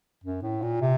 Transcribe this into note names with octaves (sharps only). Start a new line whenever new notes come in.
F#2
A2
A#2
C3